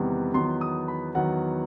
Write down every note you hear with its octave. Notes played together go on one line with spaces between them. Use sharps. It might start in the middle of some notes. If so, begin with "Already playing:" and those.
Already playing: E2 C3 D#3 G3 B3
E2 D#3 F#3 B3 C6
D#6
B5
E2 D#3 F#3 B3 F#5